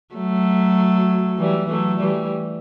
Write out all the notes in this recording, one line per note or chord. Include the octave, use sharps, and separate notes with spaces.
F#3 A3
E3 G3
F#3 A3
E3 G3